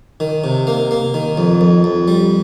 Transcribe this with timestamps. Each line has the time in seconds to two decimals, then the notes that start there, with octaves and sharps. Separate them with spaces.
0.20 D#3
0.44 C3
0.67 A#3
0.91 A#3
1.14 D#3
1.37 F2
1.61 F2
1.84 F2
2.08 G3